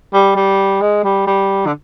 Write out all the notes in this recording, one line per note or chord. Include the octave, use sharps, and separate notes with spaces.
G3
G3
G#3
G3
G3
D3